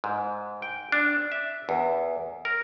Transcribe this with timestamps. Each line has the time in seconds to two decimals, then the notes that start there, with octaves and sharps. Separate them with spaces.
0.04 G#2
0.62 G5
0.92 D4
1.32 E5
1.69 E2
2.45 A#4